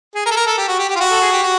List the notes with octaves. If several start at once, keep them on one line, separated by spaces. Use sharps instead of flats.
G#4
A#4
A4
A#4
A4
G4
F#4
G4
G4
F4
F#4
A4
G#4
G4
F#4